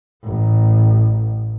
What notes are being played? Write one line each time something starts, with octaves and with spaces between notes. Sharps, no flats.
A1